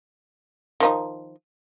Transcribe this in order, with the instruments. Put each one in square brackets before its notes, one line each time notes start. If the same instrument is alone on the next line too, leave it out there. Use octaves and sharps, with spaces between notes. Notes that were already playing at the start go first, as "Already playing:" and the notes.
[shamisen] D#3 F3 D#4